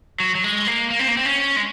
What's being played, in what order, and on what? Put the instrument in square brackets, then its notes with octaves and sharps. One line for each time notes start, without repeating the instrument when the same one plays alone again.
[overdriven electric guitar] F#3
F#3
G#3
A#3
A#3
C4
A#3
C4
C#4
G#3